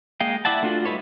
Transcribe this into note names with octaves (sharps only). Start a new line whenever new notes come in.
G#3 A#3 D#5 F5 G5
E4 D5 E5 F#5 A5
A3 D4 F4 F#4
G3 D#4 E4 B4 C#5